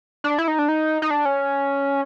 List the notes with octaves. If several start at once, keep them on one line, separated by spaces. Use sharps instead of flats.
D4
E4
D#4
D4
D#4
D#4
D4
C#4